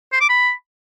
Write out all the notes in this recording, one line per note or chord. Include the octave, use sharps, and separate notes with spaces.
C5
D6
B5